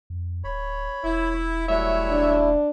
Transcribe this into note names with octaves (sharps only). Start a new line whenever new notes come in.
F2
D1 C#5 B5
E1 E4
F#3 G3 A3 E4 C#5 E5
D4